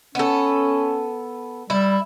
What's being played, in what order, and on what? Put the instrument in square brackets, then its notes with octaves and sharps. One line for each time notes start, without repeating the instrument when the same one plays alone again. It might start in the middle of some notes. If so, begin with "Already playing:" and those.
[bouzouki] B3 A4 [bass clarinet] C#4
[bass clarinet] G3 [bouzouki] E4